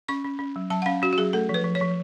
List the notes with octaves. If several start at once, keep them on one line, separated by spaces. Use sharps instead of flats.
C#4 C#6
C#4
C#4
F#3
F#3 A5
F#5
C#4 F5
C#4 F#4
F#4
F#3 G#4
A3 A4
F3
B4
F3
C#5
F3